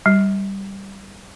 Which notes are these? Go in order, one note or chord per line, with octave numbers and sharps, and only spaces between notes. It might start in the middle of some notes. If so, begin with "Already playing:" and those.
G3